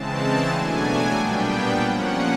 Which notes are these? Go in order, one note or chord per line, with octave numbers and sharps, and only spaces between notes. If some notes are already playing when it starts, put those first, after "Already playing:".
Already playing: C#3 E3 G#3 C4 A5
B2 F#3 A3 D4 G#5
A#2 G3 B3 D4 G5
F3 A#3 C#4 F#5